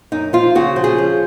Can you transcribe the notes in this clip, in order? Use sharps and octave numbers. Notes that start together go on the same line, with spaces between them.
F#2 D#4
F3 F4
C#3 F#4
F3
G#4
C#4